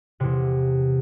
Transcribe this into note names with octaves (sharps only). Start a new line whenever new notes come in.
E2 C3